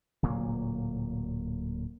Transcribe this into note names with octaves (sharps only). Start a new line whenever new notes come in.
D1 A#2 F#3 A#3